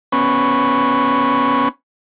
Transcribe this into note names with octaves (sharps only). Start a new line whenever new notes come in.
B3 C#4